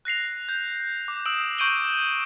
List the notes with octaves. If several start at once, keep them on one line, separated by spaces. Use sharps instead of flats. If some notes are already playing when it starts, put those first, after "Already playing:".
F#6 A#6 C7 F7
G6
D6
D#6 E6 D7 E7 F#7
C#6 G6 D7 D#7 F#7 G7
E7